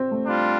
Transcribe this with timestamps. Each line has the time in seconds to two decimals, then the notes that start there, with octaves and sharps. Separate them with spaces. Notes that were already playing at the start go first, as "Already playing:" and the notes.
Already playing: C4
0.11 A3
0.23 G3 D4 F4